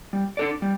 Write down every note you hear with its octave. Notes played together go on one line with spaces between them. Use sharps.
G3
D4 A4 D5
G3